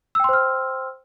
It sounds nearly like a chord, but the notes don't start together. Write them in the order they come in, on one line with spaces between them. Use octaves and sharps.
E6 G5 C6 C5 F6